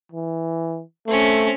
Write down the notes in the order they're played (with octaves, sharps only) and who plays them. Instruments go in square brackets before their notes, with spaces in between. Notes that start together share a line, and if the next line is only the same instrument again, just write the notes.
[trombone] E3
[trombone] A3 [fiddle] C4 C#4